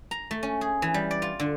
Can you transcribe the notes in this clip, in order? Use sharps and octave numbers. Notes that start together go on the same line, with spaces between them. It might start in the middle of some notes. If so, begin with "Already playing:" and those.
A#5
A3
C#4
G#4
E3
G3
D5
F4
D3